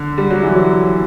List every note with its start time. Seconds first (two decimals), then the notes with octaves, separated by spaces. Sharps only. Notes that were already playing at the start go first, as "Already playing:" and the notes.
Already playing: D3
0.18 G3
0.30 F#3
0.43 E3
0.55 F#3